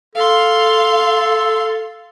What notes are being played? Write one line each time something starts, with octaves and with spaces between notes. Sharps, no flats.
A4 F5 C6